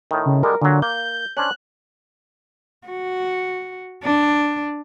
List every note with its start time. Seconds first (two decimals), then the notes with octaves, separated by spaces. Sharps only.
0.11 A2 D#3
0.26 C#3
0.43 D3 G3 G#3 A#4
0.62 A#2 D3 F#3
0.82 A#3 G6
1.37 C#4 D4 C5 F#6
2.87 F#4
4.03 D4